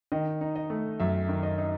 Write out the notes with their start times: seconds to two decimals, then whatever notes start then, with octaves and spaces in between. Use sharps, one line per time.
0.12 D#3 D#5
0.41 D#4
0.56 D#5
0.70 A3
1.00 F#2 E5
1.29 D#3
1.43 D#5
1.58 D#4